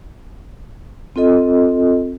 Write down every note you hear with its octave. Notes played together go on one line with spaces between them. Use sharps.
C4 F4 A4 D#5